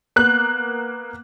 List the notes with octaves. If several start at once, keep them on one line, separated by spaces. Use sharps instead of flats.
A#3 B3 F#6